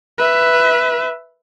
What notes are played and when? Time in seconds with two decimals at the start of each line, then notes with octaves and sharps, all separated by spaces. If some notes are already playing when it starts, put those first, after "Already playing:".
0.18 B4 E5